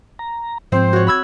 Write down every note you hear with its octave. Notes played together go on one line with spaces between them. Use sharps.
A#5
G#2 F3 C4 C5
F#4 C#5
B5 E6 G#6